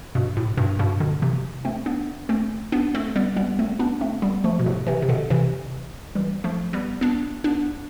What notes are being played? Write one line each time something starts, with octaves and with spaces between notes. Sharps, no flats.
G2 B2
A2
G2 B2
G2 B2
B2 D3
C3 E3
A3 C4
B3 D4
A3 C4
B3 D4
A3 C4
G3 B3
G3 B3
A3 C4
B3 D4
A3 C4
G3 B3
F3 A3
B2
A2 C3
C3 E3
C3
B2 D3
C3 E3
E3 G3
F3 A3
G3 B3
B3 D4
B3 D4